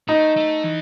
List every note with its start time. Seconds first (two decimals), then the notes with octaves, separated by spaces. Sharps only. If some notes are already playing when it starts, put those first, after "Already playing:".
0.09 A3 D#4
0.37 A3
0.64 E3